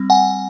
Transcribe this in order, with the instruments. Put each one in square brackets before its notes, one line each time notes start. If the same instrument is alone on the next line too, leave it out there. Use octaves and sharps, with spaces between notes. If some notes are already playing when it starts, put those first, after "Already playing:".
Already playing: [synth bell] G3 C4
F#5 G#5